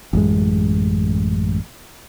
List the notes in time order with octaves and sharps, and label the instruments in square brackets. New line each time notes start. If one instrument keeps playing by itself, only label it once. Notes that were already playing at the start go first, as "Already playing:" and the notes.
[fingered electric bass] A1 F#2 G#3